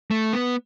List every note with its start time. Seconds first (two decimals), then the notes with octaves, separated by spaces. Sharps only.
0.11 A3
0.33 B3